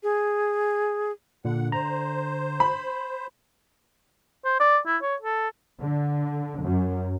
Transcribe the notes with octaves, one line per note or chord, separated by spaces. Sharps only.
G#4
A#2 D3 F#5
C5 A#5
B5
C5
D5
E4
C#5
A4
D3
F#2